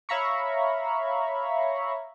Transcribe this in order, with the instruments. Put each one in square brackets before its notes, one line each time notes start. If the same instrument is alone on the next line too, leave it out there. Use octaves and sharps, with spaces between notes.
[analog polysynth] C#5 E5 F5 A#5 B5 C#6